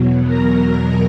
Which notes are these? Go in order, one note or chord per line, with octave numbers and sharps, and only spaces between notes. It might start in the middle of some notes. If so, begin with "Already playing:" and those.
Already playing: E2 B2 F#3
A#4 A#5